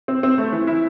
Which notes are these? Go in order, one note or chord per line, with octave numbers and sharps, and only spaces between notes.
C4
C4
A3
E3
E4